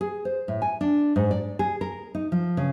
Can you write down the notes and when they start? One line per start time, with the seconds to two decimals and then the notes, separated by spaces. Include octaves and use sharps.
0.01 G#4
0.25 C5
0.48 A2
0.62 G#5
0.81 D4
1.16 G#2
1.31 D5
1.59 G#4
1.81 A#4
2.15 D#4
2.32 F3
2.57 C#3